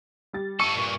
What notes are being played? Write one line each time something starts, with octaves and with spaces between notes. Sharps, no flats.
G3 A6
G2 A4 C#6 C#7 D#7
G2 A#2